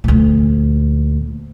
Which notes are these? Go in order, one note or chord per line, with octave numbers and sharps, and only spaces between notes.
D2 A#2